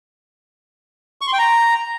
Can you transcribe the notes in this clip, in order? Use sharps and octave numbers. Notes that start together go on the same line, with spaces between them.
C#6
C6
G5
A#5